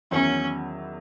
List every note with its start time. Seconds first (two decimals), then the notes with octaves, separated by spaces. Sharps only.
0.11 E2 D#3 F#3 B3 C#4 E4